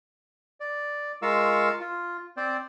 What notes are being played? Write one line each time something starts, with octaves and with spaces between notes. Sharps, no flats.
D5
G#3 F4 A#4 F5 C#6 E6
F4
C4 C5 D5